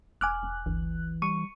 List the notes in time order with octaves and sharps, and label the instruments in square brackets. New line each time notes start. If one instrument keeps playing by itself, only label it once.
[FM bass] E1 [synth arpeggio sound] G#5 D6 F6 [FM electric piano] F#6
[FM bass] E1
[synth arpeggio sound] G1 [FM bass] D2 [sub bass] E3
[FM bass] G3 [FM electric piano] C#6 [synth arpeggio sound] D#7